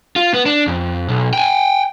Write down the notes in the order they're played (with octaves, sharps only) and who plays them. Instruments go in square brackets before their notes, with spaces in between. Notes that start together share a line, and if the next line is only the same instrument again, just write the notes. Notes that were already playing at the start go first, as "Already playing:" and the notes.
[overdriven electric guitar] F4
B3
D4
F2
B1
G5 G#5